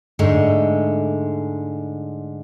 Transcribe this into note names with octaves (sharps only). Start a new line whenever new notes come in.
G#2 D3 G#3 A3